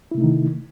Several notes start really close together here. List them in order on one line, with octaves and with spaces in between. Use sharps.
E4 C3 A3 D#4 D#3